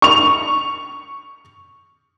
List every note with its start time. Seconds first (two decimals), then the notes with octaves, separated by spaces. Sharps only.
0.02 C#6 F7